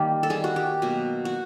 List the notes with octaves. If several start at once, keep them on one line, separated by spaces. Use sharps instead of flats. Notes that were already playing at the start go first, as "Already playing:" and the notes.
Already playing: D#3 G3 A#3 G4
A4
D#3 G3 A#3 G#4
F#4
G4
B2 F#3 A#3 F#4
F#4